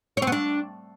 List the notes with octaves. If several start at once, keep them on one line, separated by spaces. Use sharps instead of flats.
C#5
C4
B3
D4